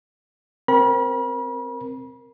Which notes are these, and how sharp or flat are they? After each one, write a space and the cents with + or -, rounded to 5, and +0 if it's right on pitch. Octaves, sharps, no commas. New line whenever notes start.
C4 +0 A#4 +0 B5 -40